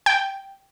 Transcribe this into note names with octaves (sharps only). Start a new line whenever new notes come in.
G5